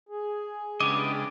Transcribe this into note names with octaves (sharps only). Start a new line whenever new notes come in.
G#4
C#3 G#3 B3 D4 E4 G4 D#5 D6